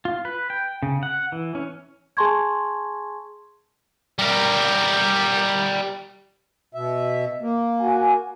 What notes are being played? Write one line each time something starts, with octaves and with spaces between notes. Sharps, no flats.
F4
B4
G5
C#3
F#5
E3
C#4
G#4 G#5 A5 C6 C#6 G#6
G3 A#4
B2 E5
A#3
F#4 G#5